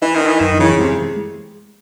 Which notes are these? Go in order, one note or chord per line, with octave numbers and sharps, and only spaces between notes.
E3 D#4
D#3
D#4
E3
F#2 D#3
C#3 E3
C3 G#3